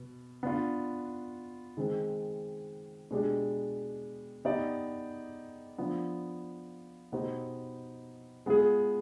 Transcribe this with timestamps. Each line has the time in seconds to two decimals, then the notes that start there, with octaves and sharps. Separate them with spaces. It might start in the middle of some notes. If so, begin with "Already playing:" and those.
Already playing: B2
0.43 B3 D4 F4
1.77 D#3 G#3 C4
3.11 B2 G#3 D4 G4
4.45 B3 D#4 G4 D5
5.78 F3 B3 D4
7.12 B2 B3 D#4 G4 C5
8.46 G#3 B3 F4 G#4